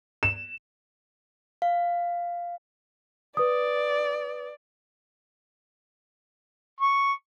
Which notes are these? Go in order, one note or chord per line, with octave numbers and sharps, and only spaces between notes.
E7
F5
B4 D5 D#6
C#6